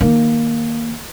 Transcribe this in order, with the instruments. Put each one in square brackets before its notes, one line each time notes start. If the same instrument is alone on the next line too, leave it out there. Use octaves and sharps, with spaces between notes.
[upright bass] D#3 A#3